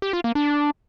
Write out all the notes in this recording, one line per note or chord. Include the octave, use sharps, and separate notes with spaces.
G4
F4
A#3
D4